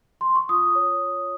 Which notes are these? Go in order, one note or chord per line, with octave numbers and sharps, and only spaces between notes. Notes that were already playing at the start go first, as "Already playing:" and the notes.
C6
C#6
F4 D#6
C#5
C#5